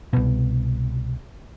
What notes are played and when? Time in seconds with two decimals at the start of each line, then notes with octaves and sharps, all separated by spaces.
0.13 C2 B2